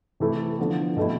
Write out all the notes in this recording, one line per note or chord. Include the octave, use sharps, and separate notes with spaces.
C3 E3 A3 E4
D3 F3 B3
B2 A3 C4 E4